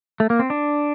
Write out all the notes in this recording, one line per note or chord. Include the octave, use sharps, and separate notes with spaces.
A3
A#3
C4
D4